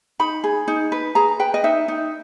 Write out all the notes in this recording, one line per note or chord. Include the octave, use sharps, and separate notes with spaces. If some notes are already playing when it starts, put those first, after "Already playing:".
D#4 B5
G#4
D#4
B4
G#4 A#5
B4 G5
D#5
D#4 E5
D#4